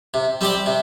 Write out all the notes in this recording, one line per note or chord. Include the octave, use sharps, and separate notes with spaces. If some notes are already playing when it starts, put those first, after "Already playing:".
C3
G3 C4 G4 D5
C3